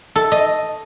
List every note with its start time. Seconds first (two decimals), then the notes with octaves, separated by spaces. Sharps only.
0.16 A4
0.32 D#5